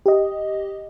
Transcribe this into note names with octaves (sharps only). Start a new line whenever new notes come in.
G4 D#5